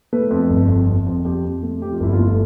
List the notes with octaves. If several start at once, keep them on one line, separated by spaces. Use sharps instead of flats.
A3 B4
F2
G1
F2
F2
F2
F2 G4
F2
A3
F2 G4
F4
G1 E4
F4
A3